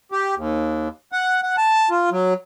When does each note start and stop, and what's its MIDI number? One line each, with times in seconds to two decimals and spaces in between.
0.12 0.35 67
0.37 0.88 39
1.12 1.41 78
1.43 1.56 78
1.57 1.89 81
1.90 2.10 65
2.11 2.34 54